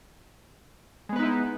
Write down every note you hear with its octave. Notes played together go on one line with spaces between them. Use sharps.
G#3 B3 D#4 E4 B4